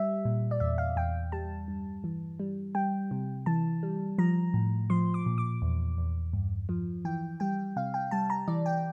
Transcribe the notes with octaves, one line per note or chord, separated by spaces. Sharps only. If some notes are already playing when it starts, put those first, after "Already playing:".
Already playing: G3 E5
A#2
D5
E2 E5
F5
E2 G5
G3 A5
G2
E3
G3
G3 G5
C3
E3 A5
G3
F3 A#5
A2
F3 C6
D6
A#2
D6
E2
E2
G2
F3
E3 G5
G3 G5
C3 F5
G5
G3 A5
A#5
E3 D5
G5